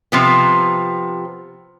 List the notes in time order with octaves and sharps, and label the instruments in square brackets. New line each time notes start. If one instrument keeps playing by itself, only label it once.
[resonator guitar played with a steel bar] C3 F3 B3